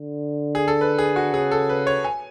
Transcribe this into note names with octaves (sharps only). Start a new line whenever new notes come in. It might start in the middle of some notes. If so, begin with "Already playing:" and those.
Already playing: D3
G#4
A4
B4
G#4
F#4
C#3 G#4
A4
B4
C#5
G#5